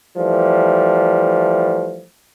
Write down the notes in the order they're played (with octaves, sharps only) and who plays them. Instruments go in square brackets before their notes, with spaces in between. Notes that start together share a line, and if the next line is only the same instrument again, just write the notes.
[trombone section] E3 F3 G3 A3